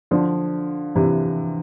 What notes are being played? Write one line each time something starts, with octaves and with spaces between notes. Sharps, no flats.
D3 F3
C3 E3